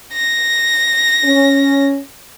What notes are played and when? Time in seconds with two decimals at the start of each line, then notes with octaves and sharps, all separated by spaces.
0.13 A#6
1.25 C#4